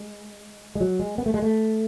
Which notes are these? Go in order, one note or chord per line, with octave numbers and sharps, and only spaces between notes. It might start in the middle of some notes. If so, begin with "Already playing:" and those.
Already playing: G#3
G#3
F#3
G#3
B3
A3
G#3
A3